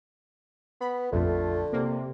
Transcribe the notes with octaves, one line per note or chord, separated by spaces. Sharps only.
B3 B5
A#1 F2 D3 A3 F4
C3 A#3